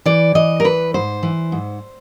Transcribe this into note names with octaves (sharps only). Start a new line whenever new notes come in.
E3 D5
E3 D#5
A#4
E3 B4
G#2 C5
E3
G#2